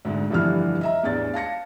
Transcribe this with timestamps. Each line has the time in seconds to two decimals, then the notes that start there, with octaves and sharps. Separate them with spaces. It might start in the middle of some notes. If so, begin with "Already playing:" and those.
0.05 D2 G#2 D3
0.30 F1 G2 D3 E3 F3 F6
0.81 D#5 E5 A#5
1.03 A1 E2 D4 A6
1.33 F5 A5 A#6 C#7